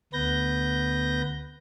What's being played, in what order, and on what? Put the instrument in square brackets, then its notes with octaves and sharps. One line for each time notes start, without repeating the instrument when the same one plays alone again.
[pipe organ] D2 B3 B4 G6 A#6